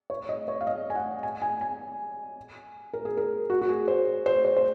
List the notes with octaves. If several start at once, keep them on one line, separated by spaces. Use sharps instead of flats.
C#5
D#5
C#5
F5
D#5
G#5
F#5
G#5
G#5
G#5
A#4
G#4
A#4
F#4
F#4
G#4
C5
C5
C5
C5